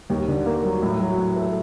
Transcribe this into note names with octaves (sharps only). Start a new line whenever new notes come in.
D#2
D3
A#3
F#3
A2
F#3
A2
A3